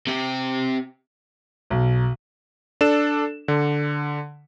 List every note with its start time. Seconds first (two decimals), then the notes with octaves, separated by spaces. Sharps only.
0.07 C3 G4
1.71 B1
2.81 D4 A4 E7
3.48 D3